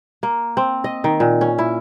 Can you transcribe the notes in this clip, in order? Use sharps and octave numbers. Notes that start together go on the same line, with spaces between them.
A#3
C4
D#5
D#3
A#2
C#4
E4